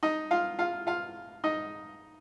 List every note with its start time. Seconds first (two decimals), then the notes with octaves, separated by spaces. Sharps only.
0.03 D#4 D#5
0.31 F4 F5
0.59 F4 F5
0.87 F4 F5
1.44 D#4 D#5